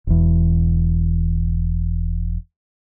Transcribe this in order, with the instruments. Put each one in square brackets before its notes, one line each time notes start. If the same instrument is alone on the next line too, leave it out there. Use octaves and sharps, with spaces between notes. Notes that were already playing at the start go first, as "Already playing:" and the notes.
[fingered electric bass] E1 E2